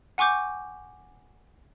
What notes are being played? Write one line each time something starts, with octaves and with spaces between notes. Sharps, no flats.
F#5 G#5 C#6 D6 G6